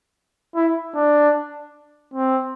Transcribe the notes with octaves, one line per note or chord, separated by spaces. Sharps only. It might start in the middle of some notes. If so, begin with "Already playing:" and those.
E4
D4
C4